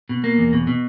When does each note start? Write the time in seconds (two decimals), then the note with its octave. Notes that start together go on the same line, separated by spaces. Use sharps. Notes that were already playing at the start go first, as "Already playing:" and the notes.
0.09 B2
0.24 A#3
0.38 E2
0.53 B2
0.67 B2